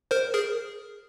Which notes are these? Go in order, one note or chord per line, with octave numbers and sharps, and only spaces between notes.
A#4 C5
G#4 A#4